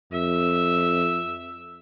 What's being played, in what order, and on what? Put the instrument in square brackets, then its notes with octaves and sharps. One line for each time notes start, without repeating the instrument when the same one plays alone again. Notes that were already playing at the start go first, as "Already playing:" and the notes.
[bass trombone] F2 [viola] E5